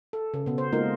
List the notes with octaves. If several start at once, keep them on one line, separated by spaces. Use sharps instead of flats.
A4
C#3
B2 B3
C5
G#3 A#3 D#4 F4 A#4